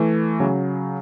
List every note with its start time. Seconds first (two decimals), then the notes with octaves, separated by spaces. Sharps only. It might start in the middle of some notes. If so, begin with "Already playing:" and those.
Already playing: E3 A3
0.40 C#3 F#3